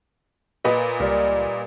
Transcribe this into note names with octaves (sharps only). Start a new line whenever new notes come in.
A#2 B4 D#5
C#2 G3 A#4